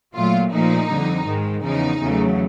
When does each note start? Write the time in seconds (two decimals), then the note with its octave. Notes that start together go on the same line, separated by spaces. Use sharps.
0.15 A#2 F#3 A3 F4
0.52 A#2 F3 A3 D#4
0.89 F2 D3 G3
1.26 G#2 D#3 G#3
1.63 E2 C#3 F3 D#4
2.01 E2 C#3 F#3 A3